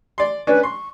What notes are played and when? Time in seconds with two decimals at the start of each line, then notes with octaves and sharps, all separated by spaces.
0.18 D5 C6
0.47 C#4 D4 B4
0.63 C6 C#6